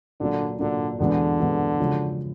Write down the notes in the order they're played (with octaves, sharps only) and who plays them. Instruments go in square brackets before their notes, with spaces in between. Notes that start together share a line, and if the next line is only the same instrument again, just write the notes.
[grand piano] A#2 F#3 A#3 [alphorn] D3
[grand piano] A#2 F#3 A#3 [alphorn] D3
[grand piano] E2 B2 G#3 B3 D4 [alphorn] D3
[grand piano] E2 B2 G#3 B3 D4
C#3 F3 G#3 C#4 F#4